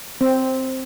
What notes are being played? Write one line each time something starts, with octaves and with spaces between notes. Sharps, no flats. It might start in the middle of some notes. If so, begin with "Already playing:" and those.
C4